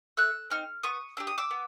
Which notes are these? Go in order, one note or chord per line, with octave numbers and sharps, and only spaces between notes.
A3 E6 F#6
C4 D#4 F6
B3 C#6 D#6
D4 G4 E6
D#6
D6 E6
B3